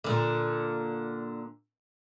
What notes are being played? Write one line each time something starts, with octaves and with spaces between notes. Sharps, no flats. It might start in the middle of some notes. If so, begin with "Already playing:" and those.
A#2 D3